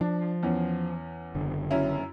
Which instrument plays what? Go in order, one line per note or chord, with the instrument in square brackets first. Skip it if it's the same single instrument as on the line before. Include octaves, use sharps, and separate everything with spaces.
[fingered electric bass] F3 [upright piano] D4
[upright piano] E2 C#4
[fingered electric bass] F#1 D3
[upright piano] F#2 C#4 E4